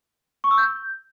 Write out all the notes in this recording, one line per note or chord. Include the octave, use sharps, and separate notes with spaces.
C#6
E6
G6